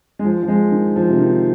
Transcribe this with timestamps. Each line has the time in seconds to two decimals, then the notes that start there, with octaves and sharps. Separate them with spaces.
0.19 G#3
0.25 F3
0.43 F3
0.48 G#3
0.72 D#3
0.96 F3
1.09 C3
1.19 D#3